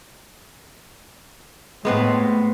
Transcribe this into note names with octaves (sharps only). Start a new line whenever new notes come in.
A2 G#3 B3 C4